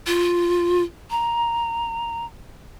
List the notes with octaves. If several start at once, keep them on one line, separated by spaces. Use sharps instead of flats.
F4
A#5